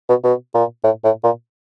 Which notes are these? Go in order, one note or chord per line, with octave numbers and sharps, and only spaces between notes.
B2
B2
A#2
A2
A2
A#2